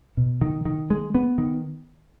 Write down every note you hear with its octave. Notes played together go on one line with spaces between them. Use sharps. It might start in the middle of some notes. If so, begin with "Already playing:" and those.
B2
D#3
D#3
G#3
B3
D#3